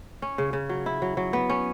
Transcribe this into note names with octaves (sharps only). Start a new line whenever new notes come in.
C#4
C#3
C#3
F#3
E4
F#3
F#3
B3
C#4